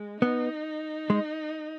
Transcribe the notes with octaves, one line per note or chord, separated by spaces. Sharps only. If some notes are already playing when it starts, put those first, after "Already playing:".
Already playing: G#3
B3 D#4
G#3